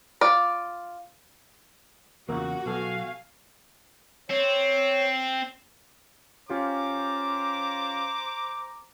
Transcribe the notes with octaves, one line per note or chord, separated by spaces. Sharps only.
F4 D5
E2 C#3 A#3 F4 F#4 F#5
B1 B3 A4 F5 G#5
C4 C#5
C#4 F4 G4 C5 A#5 D6